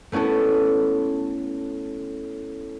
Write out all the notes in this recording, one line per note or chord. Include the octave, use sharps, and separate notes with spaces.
A3 B3 C#4 E4 A4